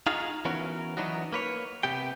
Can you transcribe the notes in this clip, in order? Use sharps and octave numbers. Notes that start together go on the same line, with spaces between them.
D#4 F4 F#4 G#4 F5
E3 B3 C#4 F#4 A#4
E3 F#3 B3 D4 D#4 F#4
A#3 B4 C#5
C3 B3 G4 G5